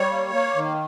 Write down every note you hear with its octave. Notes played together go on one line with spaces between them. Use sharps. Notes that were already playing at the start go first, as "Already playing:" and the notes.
Already playing: G3 C#5
A#3
A#3
D#3